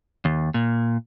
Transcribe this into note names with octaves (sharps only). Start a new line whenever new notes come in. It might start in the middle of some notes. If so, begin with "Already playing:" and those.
D#2
A#2